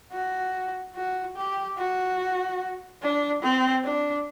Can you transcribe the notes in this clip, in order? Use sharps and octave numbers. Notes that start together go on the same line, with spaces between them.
F#4
F#4
G4
F#4
D4
C4
D4